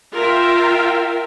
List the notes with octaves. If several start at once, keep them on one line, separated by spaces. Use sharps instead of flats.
F4 A#4 E5 F5 G5